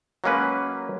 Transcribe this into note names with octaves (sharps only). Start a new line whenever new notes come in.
F#3 G#3 A#3 C#4 B4